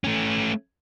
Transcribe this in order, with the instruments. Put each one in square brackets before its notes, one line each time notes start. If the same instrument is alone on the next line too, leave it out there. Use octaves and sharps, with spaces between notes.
[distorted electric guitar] A3 C#4